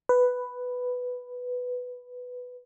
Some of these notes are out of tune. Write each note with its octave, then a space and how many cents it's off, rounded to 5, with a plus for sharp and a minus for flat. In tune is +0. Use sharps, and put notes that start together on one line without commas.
B4 +5